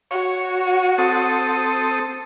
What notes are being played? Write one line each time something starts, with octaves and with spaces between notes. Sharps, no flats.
F#4 C#5
C4 A4 D#6